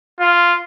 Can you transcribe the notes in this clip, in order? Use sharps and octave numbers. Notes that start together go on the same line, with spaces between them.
F4